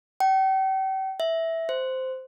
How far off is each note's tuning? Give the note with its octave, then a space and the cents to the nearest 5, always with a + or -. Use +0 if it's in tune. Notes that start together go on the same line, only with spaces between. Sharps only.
G5 -40
E5 -5
C5 -10